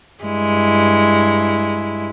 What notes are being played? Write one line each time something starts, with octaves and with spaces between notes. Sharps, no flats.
G2 G#3 E4